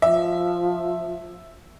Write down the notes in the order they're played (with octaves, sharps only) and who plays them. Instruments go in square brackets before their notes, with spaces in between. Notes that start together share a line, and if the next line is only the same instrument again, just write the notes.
[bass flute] F3 [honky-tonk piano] E5